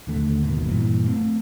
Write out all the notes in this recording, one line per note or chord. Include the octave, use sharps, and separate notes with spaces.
D#2 D3 A3
G#1 D#2 B2 D#3
G2 A#2 E3
A3 C4